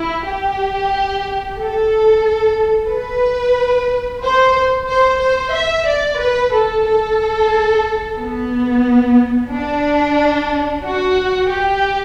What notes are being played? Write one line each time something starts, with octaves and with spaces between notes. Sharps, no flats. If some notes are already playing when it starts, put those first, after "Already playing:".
Already playing: E4
G4
A4
B4
C5
C5
C5
E5
D5
B4
A4
A4
B3
D4
F#4
G4